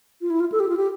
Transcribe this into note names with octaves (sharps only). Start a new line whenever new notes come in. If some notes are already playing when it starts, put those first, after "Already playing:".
F4
E4
F4
A4
G4
F4
G4